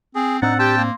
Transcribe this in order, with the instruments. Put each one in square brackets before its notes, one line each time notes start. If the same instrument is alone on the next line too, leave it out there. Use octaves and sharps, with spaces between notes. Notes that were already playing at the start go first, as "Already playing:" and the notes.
[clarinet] C4 [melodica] G#4
[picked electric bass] A2 C4 D4 [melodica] D#4 [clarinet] F#5 [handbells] E6 F#6 A6
[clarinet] G4 [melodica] G5 A5 [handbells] C6
[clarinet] A#3